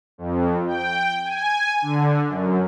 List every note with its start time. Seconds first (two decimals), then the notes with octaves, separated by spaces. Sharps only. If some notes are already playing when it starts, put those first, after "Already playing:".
0.18 F2
0.67 G5
1.24 G#5
1.82 D3
2.29 F#2